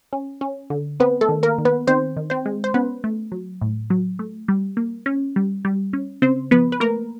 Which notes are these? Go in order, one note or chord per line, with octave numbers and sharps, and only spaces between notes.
C#4
C#4
D3
B3 C4 B4
A3 A4
D#3
A#3 A#4
D#3
B3 B4
D#3 C4 C5
D#3
C4 C5
G#3
C5
B3 C#4 B4
A3
F#3
A2
F#3
A3
G3
A#3
C#4
G3
G3
C#4
C#3 C4 C5
F3 B3 B4
B4
A3 A#3 A#4